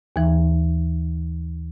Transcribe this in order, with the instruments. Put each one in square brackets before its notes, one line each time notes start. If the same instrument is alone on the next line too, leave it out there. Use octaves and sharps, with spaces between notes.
[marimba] D#2 E3